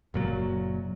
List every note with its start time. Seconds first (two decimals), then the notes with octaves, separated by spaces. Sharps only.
0.14 F#1 A#2 F#3